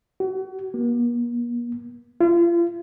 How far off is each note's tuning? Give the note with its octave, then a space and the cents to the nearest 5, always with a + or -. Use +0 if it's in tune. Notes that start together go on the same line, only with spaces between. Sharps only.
F#4 +35
A#3 +45
F4 -35